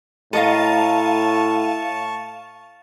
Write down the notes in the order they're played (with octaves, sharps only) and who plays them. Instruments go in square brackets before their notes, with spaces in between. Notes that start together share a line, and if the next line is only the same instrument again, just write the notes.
[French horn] A2 [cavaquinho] A4 D#5 A#5 [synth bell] F5 D#7 [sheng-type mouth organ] A5 C#6